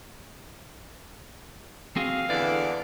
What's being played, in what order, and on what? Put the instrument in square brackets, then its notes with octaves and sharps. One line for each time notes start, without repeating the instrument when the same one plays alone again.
[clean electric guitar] C4 F#4 G#4 [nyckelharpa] F5
[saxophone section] E2 D3 E3 [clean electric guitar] D5